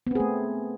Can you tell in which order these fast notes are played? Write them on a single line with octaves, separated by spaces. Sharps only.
B3 C4 G#4 A3